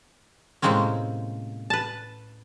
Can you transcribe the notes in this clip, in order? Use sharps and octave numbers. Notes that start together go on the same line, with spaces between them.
A2 C3 G#3 A#3 C4 C#4
B4 A5